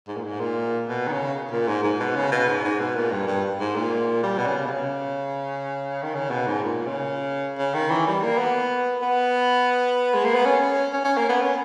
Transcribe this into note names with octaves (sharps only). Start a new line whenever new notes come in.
G#2
A#2
G#2
A#2
B2
D#3
C#3
A#2
G#2
G#2
B2
C#3
B2
G#2
G#2
B2
A#2
G2
G2
G#2
A#2
G3
B2
C#3
B2
C#3
D#3
C#3
B2
G#2
A#2
C#3
C#3
D#3
E3
G3
A#3
B3
B3
G#3
A#3
B3
C#4
C#4
C#4
A#3
B3
C#4